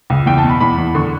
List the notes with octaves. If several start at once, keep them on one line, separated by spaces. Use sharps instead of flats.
C#2
E2 G5
A5
B2
B5
E2 B5
E2
D3 C#6